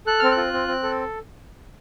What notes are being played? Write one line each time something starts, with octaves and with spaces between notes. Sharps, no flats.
A4 F#6
C4 F6
F#6
F4
C4
C4
A4